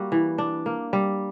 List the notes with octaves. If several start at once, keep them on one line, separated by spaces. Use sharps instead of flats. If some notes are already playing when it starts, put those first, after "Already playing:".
Already playing: G3 A#3 F#4
E3
D4
A#3
G3